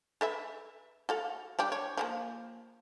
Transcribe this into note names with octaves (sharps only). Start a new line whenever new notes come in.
A4 B4 E5
F#4 A4 F5
G3 D4 G4
C#5
F3 A3 A#3